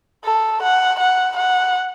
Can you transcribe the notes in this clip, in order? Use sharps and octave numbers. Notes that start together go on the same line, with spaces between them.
A4
F#5
F#5
F#5